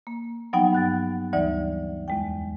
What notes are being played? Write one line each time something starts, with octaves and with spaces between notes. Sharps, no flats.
A#3
F3 F#3 B3 D#4 F#5 G5
G2 F#6 A6
D2 E3 G3 D#4 D5
E2 G#3 G5